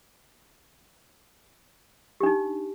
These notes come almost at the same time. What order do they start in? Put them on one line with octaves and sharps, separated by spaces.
G4 D4 D#4